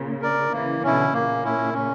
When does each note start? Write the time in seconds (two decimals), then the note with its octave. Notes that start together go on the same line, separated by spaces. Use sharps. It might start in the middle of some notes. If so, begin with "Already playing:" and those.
Already playing: A#2 C#3
0.22 A#4 D5
0.52 C#3 E3 A#3
0.83 B2 D3 C#4 E4
1.13 A#2 C#3 A#3
1.44 C#4 E4
1.74 C#4